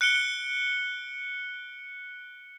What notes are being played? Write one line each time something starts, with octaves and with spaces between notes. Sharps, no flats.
F#6 C#7 D7 G7